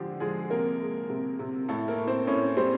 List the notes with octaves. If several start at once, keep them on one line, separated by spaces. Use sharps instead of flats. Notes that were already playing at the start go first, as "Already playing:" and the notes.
Already playing: D3 F3 G#3 G4 G#4
F3 G#3 G#4
C3 A#3 A#4
G#3
C3
C3
A2 A3 A4
A#3 A#4
A2
C4 C5
A2 C#4 C#5
G3 C4 C5